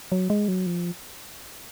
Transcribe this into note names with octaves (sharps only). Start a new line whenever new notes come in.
F#3
G#3
F#3
F3